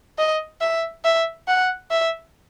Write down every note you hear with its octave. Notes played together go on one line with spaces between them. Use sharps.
D#5
E5
E5
F#5
E5